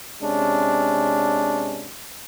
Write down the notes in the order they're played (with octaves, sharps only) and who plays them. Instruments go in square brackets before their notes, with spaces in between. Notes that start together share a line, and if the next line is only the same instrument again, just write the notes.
[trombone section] C3 G#3 C#4 D4